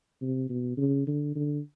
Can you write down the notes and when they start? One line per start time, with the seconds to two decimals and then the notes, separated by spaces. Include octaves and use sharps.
0.22 C3
0.50 B2
0.78 C#3
1.08 D3
1.36 D3